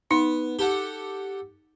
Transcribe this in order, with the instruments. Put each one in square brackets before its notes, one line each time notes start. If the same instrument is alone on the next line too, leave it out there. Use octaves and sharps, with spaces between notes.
[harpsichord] B3 [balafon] D#4
[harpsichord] G4 A4 F#5